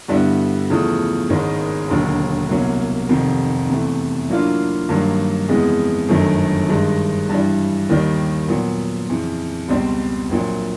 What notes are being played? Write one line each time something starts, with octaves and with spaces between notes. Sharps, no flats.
G2 D3 G3 B3 E4
E2 C#3 F3 A3
G#1 G#2 D#3 G#3 C#4
E1 D#2 D3 F#3
C2 B2 F#3 A#3 C#4
F1 F2 C3 D#3
E2 C3 E3 A3
A2 F#3 A#3 D4 F4
G2 D#3 F#3 A#3
F2 C#3 E3 G#3 B3
G1 F#2 D#3 F#3 A3
G2 D#3 G#3
G2 E3 G3
D#2 D#3 G3
A#2 F#3 B3
F2 C#3 E3
C#2 B2 G3 C4
A#1 A#2 F#3